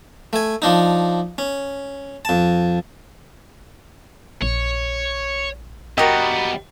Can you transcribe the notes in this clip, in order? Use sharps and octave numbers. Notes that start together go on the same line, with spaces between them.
A3 G#5
F3 D4 D#4
C#4
F2 A5
A#1 C#5
G3 B3 F#4 G4 A#4 D5 D#5